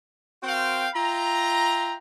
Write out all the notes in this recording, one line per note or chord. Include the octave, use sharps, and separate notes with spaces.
C4 F#4 A#4 C5 F5 G5
F4 E5 G5 A#5